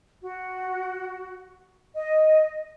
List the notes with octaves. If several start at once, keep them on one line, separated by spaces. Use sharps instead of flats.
F#4
D#5